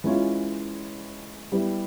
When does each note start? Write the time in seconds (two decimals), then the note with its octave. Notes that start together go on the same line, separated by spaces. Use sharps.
0.04 E3 G#3 C#4 F4
1.52 G3 B3 E4 G4